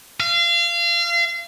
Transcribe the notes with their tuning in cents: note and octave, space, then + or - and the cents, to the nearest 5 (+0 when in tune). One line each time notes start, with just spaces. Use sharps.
F5 -30